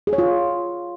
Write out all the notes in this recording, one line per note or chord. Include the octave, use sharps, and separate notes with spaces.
G#4
C#5
F4